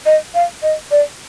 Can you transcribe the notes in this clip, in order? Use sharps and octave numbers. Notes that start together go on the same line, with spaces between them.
D#5
F5
D#5
D5